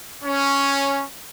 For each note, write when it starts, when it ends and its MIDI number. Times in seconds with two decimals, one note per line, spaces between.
0.24 1.04 61